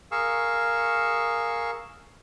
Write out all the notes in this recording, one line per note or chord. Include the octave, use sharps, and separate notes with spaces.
G#4 A#4 F5 C#6 E6